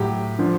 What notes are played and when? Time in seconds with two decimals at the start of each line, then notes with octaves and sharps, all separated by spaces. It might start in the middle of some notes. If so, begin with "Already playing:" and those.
Already playing: A2 F#3 G4
0.39 D3 F3